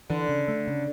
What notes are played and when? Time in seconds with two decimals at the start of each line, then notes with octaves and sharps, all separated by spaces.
0.10 D3 E3
0.29 C#3
0.48 A3
0.67 C#3